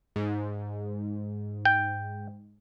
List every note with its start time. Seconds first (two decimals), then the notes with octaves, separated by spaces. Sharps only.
0.16 G#2
1.65 G5